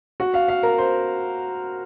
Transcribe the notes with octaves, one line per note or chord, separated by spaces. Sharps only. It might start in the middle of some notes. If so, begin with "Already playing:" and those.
F#4
F5
F5
A#4
C5